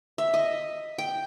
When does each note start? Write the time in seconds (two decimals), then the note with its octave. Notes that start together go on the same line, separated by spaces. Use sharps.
0.18 E5
0.34 D#5
0.98 G5